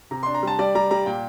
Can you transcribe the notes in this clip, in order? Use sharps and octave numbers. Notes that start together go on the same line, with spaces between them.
C3 A#5
D4 C6
A#5
G3 A5
G3 D5
G3 A#5
G3 A#5
A#2 G5